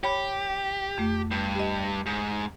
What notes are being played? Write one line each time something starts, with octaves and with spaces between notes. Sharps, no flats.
G4 C#5 B5
F2 A3
G2
G4 D#5
G#2